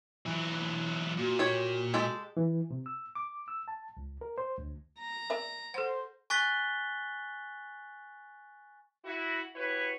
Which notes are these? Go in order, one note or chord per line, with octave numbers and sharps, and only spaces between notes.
E3 F#3
A#2 F#4
G4 C#5
G#3 G4 A4
E3
C3
E6
D6
E6
A5
C#2
A#4
C5
D2
A#5
A#4 D5 E5
A4 C5 F#5
G#5 C#6 F#6 A6 B6 G7
E4 F#4
E4 F#4 G4 B4 C#5